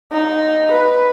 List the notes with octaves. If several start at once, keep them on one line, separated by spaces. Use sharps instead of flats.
D#4
B4